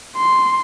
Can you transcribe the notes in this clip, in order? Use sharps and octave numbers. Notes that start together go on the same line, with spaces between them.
C6